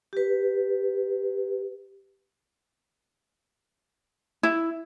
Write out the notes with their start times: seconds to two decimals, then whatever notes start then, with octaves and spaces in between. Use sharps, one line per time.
0.13 G4 B4
4.43 E4